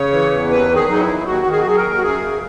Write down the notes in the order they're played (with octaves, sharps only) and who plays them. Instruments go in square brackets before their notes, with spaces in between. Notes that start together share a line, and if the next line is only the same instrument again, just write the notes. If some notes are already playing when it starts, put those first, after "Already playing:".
Already playing: [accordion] C#3 C#5
E3
E2
D#2 B4
D#3
G#4
F#3 D#4
E4
D#2
D#2 F#4
D#3
G#4
F#4
F#3 G#4
A#4
D#2
F#4
F#2 G#4
C#3